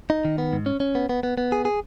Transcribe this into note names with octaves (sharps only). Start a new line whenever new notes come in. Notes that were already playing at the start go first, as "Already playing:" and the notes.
D#4
D#3
B3
G#2
C#4
C#4
B3
B3
B3
B3
G#4
G#4